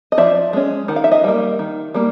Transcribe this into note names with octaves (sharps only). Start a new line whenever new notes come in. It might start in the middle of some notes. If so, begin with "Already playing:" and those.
D#5
F3 D5 E5
G#3 C#4
D#3 F#5
F5
E5
D#5 F5
G3 A#3
D#3
G3 A#3